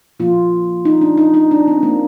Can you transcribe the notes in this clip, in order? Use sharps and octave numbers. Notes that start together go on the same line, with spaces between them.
A#2 F3 A#3 F4
D#4
D4
D#4
D#4
D4
C4
A#3